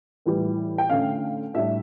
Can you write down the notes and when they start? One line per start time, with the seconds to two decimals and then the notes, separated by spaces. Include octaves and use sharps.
0.26 A2 E3 G3
0.78 G5
0.90 D3 A3 C#4 F5
1.54 A2 G3 D4 E5